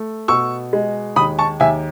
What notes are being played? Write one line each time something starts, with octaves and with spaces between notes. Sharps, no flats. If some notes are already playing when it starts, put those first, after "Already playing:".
Already playing: A3
B2 C#6 E6
G#3
D#2 B5 D#6
A5 C#6
D#2 E5 G#5